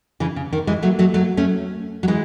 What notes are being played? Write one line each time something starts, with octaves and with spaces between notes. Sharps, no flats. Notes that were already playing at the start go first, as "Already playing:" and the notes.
C#3 E3
C#3
D#3
E3 G#3
F#3 A3
F#3 A3
F#3 A3
A3 C#4
F#3
E3 G#3